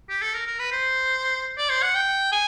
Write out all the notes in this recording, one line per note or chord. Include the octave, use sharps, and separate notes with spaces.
G4
A4
A#4
A#4
B4
C5
D5
C5
F#5
G5
G#5